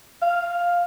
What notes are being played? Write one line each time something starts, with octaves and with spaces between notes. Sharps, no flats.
F5